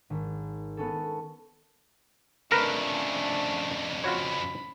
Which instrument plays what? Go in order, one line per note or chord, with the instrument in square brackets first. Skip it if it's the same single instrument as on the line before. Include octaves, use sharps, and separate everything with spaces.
[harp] G#1
B3 C#4 A4
[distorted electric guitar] F2 C#3 [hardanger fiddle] A3 D4 [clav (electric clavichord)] A#4 B4
[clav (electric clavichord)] F4 F#4 C#5 [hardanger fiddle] B5